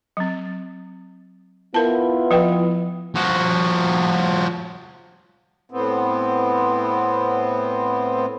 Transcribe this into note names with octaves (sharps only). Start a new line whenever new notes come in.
F#3 C4
B3 E4 F4 A#4 A5
F3 B4 G5
F3 F#4
A2 B3 C4